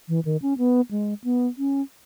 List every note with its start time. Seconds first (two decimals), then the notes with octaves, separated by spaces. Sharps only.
0.09 E3
0.25 D#3
0.42 C#4
0.58 B3
0.91 G#3
1.24 B3
1.58 C#4